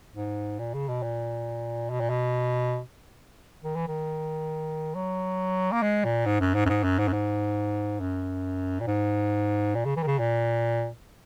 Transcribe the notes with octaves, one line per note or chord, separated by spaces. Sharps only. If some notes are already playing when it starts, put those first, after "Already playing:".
G#2
A#2
C#3
B2
A#2
B2
A#2
B2
D#3
E3
D#3
F#3
A#3
G#3
A#2
G#2
F#2
G#2
F#2
G#2
F#2
G#2
F#2
G#2
F#2
A#2
G#2
A#2
C#3
E3
D#3
C#3
A#2